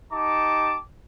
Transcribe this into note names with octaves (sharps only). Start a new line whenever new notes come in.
D#4 G4 A5 D6